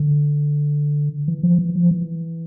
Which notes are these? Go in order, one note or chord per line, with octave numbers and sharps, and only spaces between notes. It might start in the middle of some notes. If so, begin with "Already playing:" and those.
Already playing: D3
E3
F3
E3
F3
E3